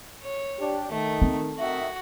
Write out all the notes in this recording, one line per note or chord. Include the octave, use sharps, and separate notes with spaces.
C#5
D4 G4
D#3 A3
C4
D#3 F#4 E5